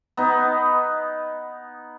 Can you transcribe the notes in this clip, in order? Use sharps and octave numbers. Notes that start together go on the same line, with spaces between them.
B3 D#4